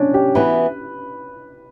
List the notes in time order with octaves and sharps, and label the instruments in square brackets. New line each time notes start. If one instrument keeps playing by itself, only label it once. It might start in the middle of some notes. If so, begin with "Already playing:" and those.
Already playing: [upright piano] C#4 D4
G4
[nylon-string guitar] E3 B3 F#4 [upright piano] B4